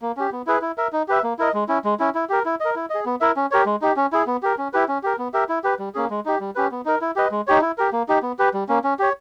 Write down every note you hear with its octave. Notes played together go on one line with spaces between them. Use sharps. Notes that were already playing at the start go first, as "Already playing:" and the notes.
A#3
C#4 G4
B3
E4 G#4 B4
E4
A#4 E5
D#4
G4 B4 E5
A#3
E4 A#4 D#5
G#3
C#4 E4
G#3
C#4 E4
E4
G4 A#4
E4
A#4 D#5
E4
G#4 D#5
B3
E4 A#4 E5
C#4
G4 A#4 C#5
G#3
D#4 G4
C#4
E4 G#4
B3
G4 A#4
C#4
E4 G4 B4
C#4
G4 A#4
B3
G4 A#4 E5
E4
G4 B4
G3
A#3 C#4 G#4
G#3
D#4 G4
G3
C#4 G4 B4
B3
D#4 A#4
E4
G4 B4 D#5
G#3
D#4 G4 C#5
E4
G4 A#4
A#3
D#4 G4
B3
G4 B4
G3
A#3 C#4
C#4
G4 C#5